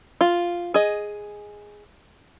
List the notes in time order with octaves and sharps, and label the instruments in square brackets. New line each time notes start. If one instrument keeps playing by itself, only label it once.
[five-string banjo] F4
G#4 D#5